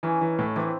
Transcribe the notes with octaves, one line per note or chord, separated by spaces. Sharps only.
E3 C#4 D#4
E3
A2
E3 C4 D4